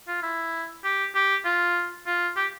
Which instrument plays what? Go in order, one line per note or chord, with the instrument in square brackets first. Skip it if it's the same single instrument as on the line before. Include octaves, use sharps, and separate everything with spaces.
[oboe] F4
E4
G4
G4
F4
F4
G4